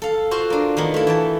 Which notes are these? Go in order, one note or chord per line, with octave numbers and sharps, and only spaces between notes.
A4 F5
F4 F#4 C5
A#3 D4
D#3 A#3 B3
A3 E4
E3 G5 A5